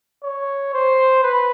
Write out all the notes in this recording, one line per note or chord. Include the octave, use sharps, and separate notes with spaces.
C#5
C5
B4